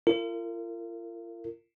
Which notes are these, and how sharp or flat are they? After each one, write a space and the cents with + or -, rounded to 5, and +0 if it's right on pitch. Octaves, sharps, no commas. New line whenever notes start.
F4 -40 A#4 -35